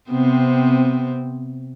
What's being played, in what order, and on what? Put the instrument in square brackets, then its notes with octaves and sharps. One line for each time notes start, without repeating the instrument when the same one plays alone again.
[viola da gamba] C3 B3 C4